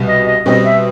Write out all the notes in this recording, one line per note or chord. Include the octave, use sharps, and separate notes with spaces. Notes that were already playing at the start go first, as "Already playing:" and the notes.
Already playing: C2 B2 G3
D#5
D#5
B2 G3 C4 D#5
E5